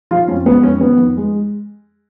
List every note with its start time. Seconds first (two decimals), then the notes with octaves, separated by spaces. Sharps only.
0.11 F3 F4
0.28 F2 C#4
0.45 G#3 B3
0.63 F2 C#4
0.81 D#3 B3
0.98 F2
1.17 G#3